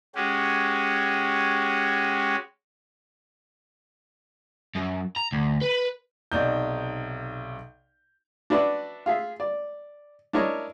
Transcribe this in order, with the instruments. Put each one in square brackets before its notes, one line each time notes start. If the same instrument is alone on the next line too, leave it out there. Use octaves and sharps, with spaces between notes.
[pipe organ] G#3 C#4 F#4 G4
[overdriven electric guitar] F#2
A#5
D2
B4
[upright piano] B1 C3 D#4 D5 G6
[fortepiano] D4 F#4 B4 D5 E5
F4 G#4 E5
D5
D4 E4 A#4 C#5 D#5